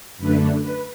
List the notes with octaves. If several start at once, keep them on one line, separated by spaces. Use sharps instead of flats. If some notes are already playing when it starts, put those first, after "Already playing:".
F#2 D3 A3 D4 B4
B4